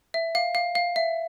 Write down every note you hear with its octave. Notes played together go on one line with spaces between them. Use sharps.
E5
F5
F5
F5
E5